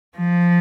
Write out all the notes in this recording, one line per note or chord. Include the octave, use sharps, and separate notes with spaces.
F3